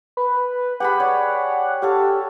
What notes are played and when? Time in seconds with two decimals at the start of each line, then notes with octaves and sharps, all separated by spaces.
0.17 B4
0.80 G4 G#4 F#5 B5
1.00 C#5 D5
1.82 G4 A4 C#5 F5